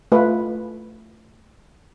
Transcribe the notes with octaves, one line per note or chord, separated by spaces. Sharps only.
A3 F4 B4